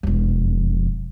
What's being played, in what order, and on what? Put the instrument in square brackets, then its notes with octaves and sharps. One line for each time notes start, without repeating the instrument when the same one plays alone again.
[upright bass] E1 F2